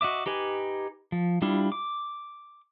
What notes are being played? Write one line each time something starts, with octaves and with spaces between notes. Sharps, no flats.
F#4 D#5 E5 D6
D#4 G4 B4 G#5
F3
G3 D4 E4 F4
D6